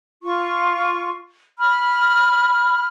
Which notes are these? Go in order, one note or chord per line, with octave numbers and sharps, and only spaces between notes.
F4 C#6
B5 F6